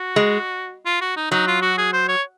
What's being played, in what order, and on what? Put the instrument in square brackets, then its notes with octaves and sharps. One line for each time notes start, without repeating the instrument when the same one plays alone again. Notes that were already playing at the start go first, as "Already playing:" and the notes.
Already playing: [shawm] F#4
[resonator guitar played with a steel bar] G#3
[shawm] F4
F#4
D#4
[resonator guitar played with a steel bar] F#3 [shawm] D#4
[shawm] F4
F#4
G#4
C5
C#5